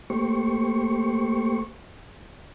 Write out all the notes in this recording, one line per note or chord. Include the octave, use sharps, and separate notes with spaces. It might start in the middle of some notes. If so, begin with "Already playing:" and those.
A3 A#3 G4 C5 C#6